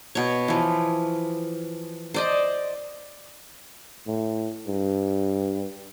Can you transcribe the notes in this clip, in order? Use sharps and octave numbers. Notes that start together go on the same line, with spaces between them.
B2 C#5
E3 F3
C5 D5 D#5
A2
G2